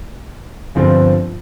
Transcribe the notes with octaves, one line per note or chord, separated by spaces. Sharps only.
G1 G2 D3 F3 C4